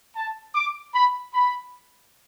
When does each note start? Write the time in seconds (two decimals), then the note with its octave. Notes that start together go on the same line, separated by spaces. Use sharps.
0.15 A5
0.54 D6
0.94 B5
1.33 B5